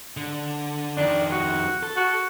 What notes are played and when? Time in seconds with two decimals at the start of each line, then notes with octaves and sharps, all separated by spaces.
0.17 D3
0.97 F2 D#3 D4
1.32 F#4
1.83 A4
1.96 F#4